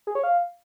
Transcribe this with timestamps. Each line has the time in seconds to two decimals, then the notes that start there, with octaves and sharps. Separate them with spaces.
0.07 G#4
0.15 C#5
0.24 F5